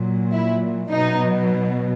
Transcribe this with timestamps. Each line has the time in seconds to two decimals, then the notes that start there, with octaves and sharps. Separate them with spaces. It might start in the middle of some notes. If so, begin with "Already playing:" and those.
Already playing: A#2 F#3
0.32 E4
0.91 B2 F#3 D#4